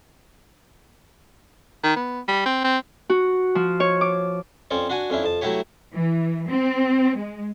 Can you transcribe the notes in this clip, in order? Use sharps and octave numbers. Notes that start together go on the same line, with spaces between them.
D#3
B3
G3
C4
C4
F#4
F3
C#5
D6
F2 C4 C#4 D5 C#6
D4 F#4 F#5 G#5
F2 C#4 D4 E4
F2 A5
F#3 A3 E4 F#4 G4 C#5
E3
C4
G#3